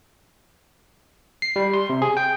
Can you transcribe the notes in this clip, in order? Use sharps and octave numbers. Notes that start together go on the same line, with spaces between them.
C7
G3
C6
C3
G#4
G5